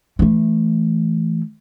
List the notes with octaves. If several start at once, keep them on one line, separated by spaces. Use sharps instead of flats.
E3 A3